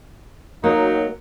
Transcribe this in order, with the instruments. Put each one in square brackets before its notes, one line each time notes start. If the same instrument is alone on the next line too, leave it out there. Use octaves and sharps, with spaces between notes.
[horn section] F#3 D#4 [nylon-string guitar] A#3